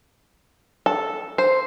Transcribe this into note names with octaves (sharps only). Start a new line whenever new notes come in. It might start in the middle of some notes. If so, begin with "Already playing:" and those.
A4
C5